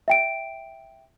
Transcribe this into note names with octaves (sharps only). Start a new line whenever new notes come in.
E5 G5 D7